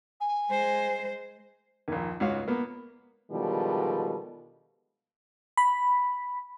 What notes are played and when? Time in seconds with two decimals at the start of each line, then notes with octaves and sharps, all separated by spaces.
0.21 G#5
0.50 G#3 C5
1.88 A#1 D#2
2.20 C#2 G#2 F#4 C#5 F5
2.48 A#3 B3
3.31 B2 D3 D#3 F3 G3 G#3
5.57 B5